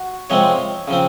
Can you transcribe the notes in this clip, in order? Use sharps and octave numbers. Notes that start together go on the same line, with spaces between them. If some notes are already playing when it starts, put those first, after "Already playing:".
Already playing: F#4
C3 F3 G#3 C4 C#5
C#3 F3 C4